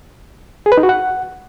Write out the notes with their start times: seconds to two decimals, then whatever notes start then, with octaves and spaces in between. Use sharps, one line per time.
0.66 G#4
0.72 B4
0.77 D#4
0.83 F#4
0.89 F#5